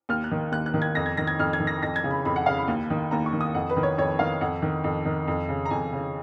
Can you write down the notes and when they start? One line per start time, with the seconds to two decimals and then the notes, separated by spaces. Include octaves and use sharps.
0.09 D#2 F6
0.24 F#6
0.31 D#3
0.52 D#2 F#6
0.66 F#6
0.74 D#3
0.82 G#6
0.95 F2 A#6
1.06 G#6
1.17 D#3 A#6
1.27 G#6
1.39 F2 F6
1.53 G#6
1.60 D#3
1.67 A#6
1.82 F2 A#6
1.96 G#6
2.04 C#3
2.11 B5
2.25 F2 B5
2.36 F#5
2.46 C#3 F5
2.57 B5
2.68 D#2
2.90 D#3
3.11 D#2 A#5
3.26 C#6
3.33 D#3
3.41 D#6
3.54 F2 F#5
3.70 B4
3.77 D#3
3.83 C#5
3.98 F2 C#5
4.19 D#3 F5
4.41 F2 F#5
4.62 D#3
4.84 F2
5.05 D#3
5.28 F2
5.49 C#3
5.66 A#5
5.70 F2 G#5
5.93 C#3